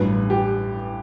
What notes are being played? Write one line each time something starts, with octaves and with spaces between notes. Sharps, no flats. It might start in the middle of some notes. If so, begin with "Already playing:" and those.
Already playing: A1 G2 F#3 B4
G4